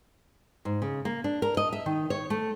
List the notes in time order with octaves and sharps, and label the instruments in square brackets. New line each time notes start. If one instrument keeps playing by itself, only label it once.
[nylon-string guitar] G#2
C#3
A#3
D4
A#4
D#5
E5
D#3
C#5
A3